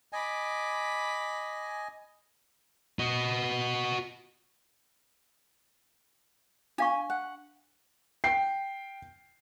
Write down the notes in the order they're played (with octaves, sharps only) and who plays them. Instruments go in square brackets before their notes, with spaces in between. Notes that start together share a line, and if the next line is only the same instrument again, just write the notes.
[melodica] D#5 G#5 [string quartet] B5 D6
[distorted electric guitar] F#4 D#5
[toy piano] D4 F5 C#6 [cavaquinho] G#5
[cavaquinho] F#5
[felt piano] G5 C7